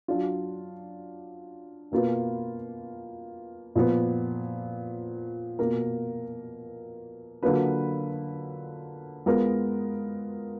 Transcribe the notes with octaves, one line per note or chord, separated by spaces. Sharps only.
F#3 D4 F4
B2 A#3 F4 B4
A#2 F3 B3
B2 A#3 F4 A#4
D3 F#3 A#3 F4 B4
G#3 B3 F4 A#4